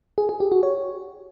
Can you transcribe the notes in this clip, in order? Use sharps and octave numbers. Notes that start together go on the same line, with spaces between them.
G#4
G#4
G4
F#4
C#5